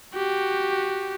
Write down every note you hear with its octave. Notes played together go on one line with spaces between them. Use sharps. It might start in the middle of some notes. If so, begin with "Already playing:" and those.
F#4 G4